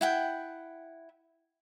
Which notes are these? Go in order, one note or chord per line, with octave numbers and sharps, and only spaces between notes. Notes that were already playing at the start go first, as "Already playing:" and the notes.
E4 F#5 G5